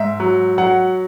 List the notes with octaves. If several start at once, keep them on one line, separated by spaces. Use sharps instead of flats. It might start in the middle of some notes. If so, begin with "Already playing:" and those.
Already playing: G#2 E5
F#3
F#3 F#5